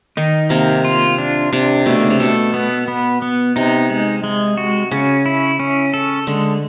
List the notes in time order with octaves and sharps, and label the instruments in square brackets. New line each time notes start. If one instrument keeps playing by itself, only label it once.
[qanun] D#3 [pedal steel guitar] D#4
[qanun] C3 [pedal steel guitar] A#3
[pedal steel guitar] F4
D4
[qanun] C3 [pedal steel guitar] D4
[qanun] B2 [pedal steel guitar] A3
[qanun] C#3
C3
[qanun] B2 [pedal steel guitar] A4
[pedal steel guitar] B3
B3
B3
[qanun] C3 [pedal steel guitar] D#4
[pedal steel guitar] G#3
G#3
F#4
[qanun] C#3 [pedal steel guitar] C#4
[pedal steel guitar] E4
C#4
A4
[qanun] D3 [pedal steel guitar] G#3